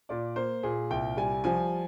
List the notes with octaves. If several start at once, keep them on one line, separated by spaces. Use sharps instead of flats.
A#2 D5
A#3 C5
A#2 G#4
C2 G5
G3 G#5
F3 G#5